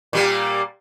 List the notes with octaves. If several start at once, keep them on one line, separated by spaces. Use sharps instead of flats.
A#2 G3 A#3